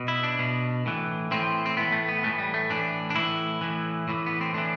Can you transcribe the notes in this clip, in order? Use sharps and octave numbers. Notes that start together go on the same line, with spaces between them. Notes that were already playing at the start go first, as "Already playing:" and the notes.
Already playing: B2
E4
D4
B2
A2 E3
A2 E3 C4
C4
A2 E3 B3
A3
B3
A2 E3 A3
G3
A3
A2 E3 D4
D4
A2 E3 E4
A2 E3
A2 E3
B3
C4
A2 E3 D4